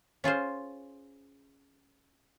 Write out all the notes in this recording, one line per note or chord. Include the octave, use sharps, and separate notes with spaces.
C#4 F4 G#4 C5